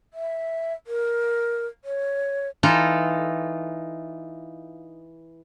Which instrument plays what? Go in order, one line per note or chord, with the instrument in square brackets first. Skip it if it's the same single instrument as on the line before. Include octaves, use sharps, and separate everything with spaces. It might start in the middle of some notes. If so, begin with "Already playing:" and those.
[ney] E5
A#4
C#5
[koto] E3 D#4 F4 A4